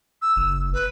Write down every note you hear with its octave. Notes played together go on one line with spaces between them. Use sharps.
E6
F#1
B4